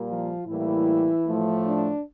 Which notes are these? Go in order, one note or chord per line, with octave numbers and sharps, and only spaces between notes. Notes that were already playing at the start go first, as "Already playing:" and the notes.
Already playing: A#2 G3 A#3
F3 F4
A2 E3 G3 A#3 E4
A2 F3 A3
D4